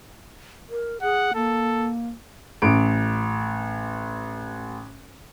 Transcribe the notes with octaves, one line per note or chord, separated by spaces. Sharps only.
A#4
G#4 F#5
A#3 A4
A1 D7